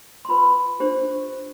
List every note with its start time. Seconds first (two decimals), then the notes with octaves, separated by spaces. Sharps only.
0.25 C6
0.29 F4 B4 B5
0.80 D4 G4 C5